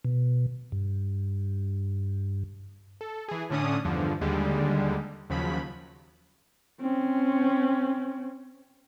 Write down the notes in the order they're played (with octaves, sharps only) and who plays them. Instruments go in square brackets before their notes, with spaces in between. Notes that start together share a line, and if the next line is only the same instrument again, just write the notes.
[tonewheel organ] B2
G2
[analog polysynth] A4
E3 G#4
A2 D3 C#4 D4 D#6
E2 G2 D3 F3
D#2 D3 G3 G#3
D#2 C#3 F3 F#3 B5
[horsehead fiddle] C4 C#4